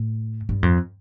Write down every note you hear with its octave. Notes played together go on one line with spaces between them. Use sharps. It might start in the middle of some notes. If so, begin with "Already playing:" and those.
Already playing: A2
G2
F2